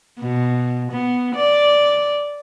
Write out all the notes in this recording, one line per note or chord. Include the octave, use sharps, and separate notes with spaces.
B2
B3
D5